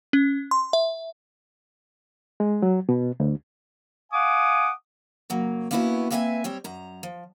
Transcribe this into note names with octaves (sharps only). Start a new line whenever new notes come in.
C#4
C6
E5
G#3
F#3
B2
D2
F5 F#5 G#5 D6 D#6
C#3 F#3 A#3
A#3 B3 C#4 E4 F#4 B4
A#3 C4 B4 E5 F#5 G#5
G3 C4 C#5
F#2 A#5
F3